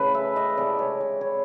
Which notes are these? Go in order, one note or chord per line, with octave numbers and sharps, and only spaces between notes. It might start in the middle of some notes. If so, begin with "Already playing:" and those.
Already playing: C#3 E3 A3 A4 B4
E5
D#5
C3 E3 G#3 D5
C#5
D5
C#5